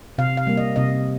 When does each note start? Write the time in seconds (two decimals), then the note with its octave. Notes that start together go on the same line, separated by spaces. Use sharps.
0.18 C3 F5
0.37 F5
0.47 G3 A#3
0.57 D#5
0.76 C3 D#5